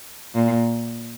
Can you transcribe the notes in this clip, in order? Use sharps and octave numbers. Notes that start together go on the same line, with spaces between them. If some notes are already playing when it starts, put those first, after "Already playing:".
A#2